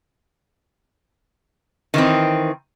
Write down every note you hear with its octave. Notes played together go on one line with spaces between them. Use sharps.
D#3 E3 C4